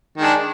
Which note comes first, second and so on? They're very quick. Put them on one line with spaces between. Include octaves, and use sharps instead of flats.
D#3 G#3 D4